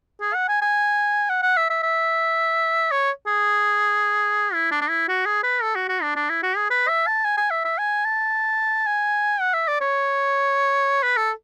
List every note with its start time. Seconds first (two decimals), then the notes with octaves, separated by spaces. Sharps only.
0.21 G#4
0.34 F#5
0.48 G#5
0.62 G#5
1.30 F#5
1.42 F#5
1.57 E5
1.70 E5
1.83 E5
2.91 C#5
3.27 G#4
4.54 E4
4.71 D4
4.81 D4
4.89 E4
5.08 F#4
5.26 G#4
5.43 B4
5.63 A4
5.75 F#4
5.89 F#4
6.02 D4
6.16 D4
6.29 E4
6.43 F#4
6.57 G#4
6.70 B4
6.88 E5
7.07 A5
7.25 G#5
7.37 G#5
7.51 E5
7.65 E5
7.78 G#5
8.05 A5
8.86 G#5
9.41 F#5
9.54 E5
9.68 D5
9.81 C#5
11.03 B4
11.17 A4